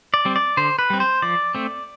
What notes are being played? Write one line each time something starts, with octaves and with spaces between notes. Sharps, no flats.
D5
G3 C4
D5
D3 C5
B4
G3 C4
C5
F3 D5
A3 C4